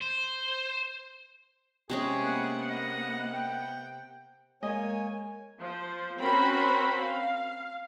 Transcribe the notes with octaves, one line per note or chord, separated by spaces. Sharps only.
C5
C3 G#3 C#4 G#4
A#3 B3 F#5
D#5
G5
G#3 A#3 C#5 D#5 G#5
F3 C5
C4 C#4 F#4 A#4 C5 B5
F5